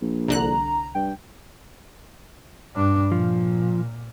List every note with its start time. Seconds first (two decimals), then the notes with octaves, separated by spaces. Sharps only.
0.02 A#1
0.28 C2 D3 A#5 F#6
0.95 G2 G5
2.75 G2 D4
3.12 A#2 F3